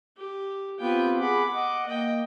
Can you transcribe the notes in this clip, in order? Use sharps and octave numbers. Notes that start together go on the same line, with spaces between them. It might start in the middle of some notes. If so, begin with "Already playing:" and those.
G4
B3 C4 F4 G4 G5
G#4 F#5 B5 D6
D#5 F#5
A#3 D#5 G5